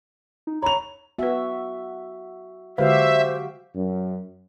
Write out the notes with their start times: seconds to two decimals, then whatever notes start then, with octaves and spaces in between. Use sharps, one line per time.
0.47 D#4
0.62 C#5 A#5 B5 F7
1.18 B3 F#4 B4 E5
2.78 D3 G#3 F#4 G4 B4 C5 E5 F5
3.75 F#2